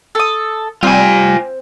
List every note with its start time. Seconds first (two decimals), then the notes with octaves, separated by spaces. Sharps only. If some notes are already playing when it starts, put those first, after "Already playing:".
0.15 A4 D#6
0.83 G3 C4 F4 G#5